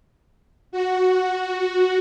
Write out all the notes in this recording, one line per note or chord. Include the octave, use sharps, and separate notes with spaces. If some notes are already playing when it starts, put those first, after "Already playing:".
F#4